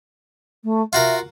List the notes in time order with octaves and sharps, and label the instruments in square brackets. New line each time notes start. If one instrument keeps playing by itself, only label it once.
[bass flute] A3
[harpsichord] F4 F#4 A#4 [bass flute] E5